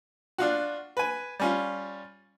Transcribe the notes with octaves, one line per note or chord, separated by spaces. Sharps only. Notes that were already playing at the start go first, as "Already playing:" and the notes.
D4 F4 F#4
B4 G#5
G3 C#4 F4